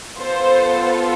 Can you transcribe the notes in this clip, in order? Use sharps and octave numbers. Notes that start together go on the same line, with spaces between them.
B3 F4 A4 C5